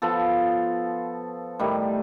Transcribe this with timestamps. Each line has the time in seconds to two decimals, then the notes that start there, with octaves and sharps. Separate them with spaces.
0.02 F3 B3 A4
1.59 A2 D#3 G3